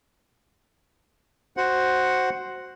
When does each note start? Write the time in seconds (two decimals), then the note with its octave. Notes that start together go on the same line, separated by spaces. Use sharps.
1.57 F#4 C5 F#5